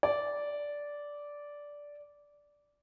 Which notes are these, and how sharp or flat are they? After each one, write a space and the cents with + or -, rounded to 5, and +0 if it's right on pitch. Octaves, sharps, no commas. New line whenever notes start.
D5 -10